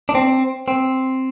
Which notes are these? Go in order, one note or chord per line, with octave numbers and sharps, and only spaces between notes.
D4
C4
C4